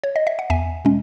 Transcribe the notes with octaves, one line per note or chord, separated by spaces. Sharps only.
C#5
D#5
E5
F#5
E2 E5 G#5
B2 G#3 C#4